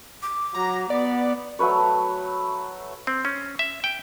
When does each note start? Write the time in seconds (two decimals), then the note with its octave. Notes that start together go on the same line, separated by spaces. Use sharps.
0.22 D6
0.54 F#3 A#5
0.90 B3 D5
1.59 F#3 A3 B4 C#5
3.07 C4
3.25 C#4
3.59 E5
3.84 G5